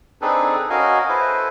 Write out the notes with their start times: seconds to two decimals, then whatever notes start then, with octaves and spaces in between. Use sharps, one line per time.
0.22 C4 D4 D#4 G#4 A4 B4
0.70 C#4 F#4 A#4 D#5 F5 G#5
1.09 E4 A4 B4 C5